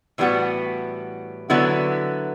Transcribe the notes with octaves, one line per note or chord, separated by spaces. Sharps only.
A2 E3 G3 B3 F#4
D3 F#3 B3 E4